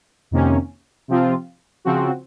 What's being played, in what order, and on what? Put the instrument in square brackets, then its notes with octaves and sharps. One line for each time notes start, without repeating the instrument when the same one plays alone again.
[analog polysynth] F2 C3 D#3 A#3 C#4
C3 F3 C4 F4
C#3 F3 C4 F#4